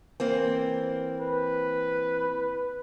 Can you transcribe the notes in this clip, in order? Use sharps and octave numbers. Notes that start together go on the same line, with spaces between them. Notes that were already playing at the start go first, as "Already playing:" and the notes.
E3 A#3 C4
B4